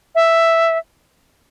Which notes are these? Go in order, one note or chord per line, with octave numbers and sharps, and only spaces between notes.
E5